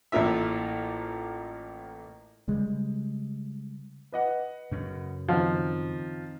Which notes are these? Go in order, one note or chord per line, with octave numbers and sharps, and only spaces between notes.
A1 A2 A#3 F4 E5
C#3 G3 G#3
B4 D#5 F#5
F#2 C#3
D#3 F3 C4 C5